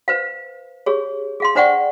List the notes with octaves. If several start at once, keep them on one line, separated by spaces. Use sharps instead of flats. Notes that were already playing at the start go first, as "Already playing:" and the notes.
B4 C5 F5
G4 G#4 C#5
G#4 F5 C6
D4 C5 D5 F#5 G5 C#6